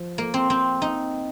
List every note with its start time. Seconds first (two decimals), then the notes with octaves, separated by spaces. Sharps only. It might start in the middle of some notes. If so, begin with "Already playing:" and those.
Already playing: F3
0.18 A#3
0.34 C4
0.50 C4
0.82 D#4